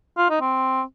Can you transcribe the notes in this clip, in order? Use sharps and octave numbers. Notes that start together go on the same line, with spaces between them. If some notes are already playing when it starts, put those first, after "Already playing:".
F4
D#4
C4